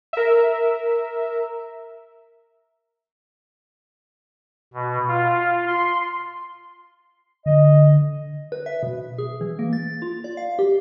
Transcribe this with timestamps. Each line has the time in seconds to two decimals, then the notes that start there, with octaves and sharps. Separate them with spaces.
0.13 A#4 E5
4.74 B2
5.08 F4
5.68 C6
7.46 D3 D#5
8.52 B4
8.66 E5
8.83 B2
9.19 G#4
9.41 E3
9.59 A#3
9.73 A6
10.02 F4
10.24 D5
10.37 F5
10.59 G4